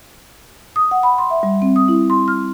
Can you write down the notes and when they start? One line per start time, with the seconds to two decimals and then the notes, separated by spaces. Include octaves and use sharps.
0.76 D#6
0.91 F#5
1.03 B5
1.18 C6
1.30 E5
1.43 G3
1.62 C4
1.76 D#6
1.88 E4
2.10 C6
2.28 F6